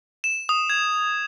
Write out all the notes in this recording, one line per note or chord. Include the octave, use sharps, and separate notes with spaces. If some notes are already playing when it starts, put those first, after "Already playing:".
E7
D#6
G#6